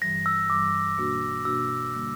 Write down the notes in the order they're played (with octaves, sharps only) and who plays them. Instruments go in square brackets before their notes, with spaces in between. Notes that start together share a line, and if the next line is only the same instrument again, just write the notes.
[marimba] G2 E3 G3 [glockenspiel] A#6
[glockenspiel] E6
[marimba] G2 E3 G3 [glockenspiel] D6
[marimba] B2 A#3 D4 F#4
[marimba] B2 A#3 D4 F#4 [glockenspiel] E6
[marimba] D3 G3 A#3